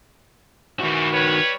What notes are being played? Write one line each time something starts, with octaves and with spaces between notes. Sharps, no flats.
E2 D#3 E3 F#4
G3 B4 C#5